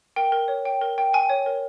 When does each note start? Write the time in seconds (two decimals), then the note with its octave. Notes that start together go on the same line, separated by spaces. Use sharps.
0.16 A#4 G5
0.32 A#4
0.48 C#5
0.65 G5
0.81 A#4
0.98 G5
1.13 G5 G#5
1.29 C#5
1.46 A#4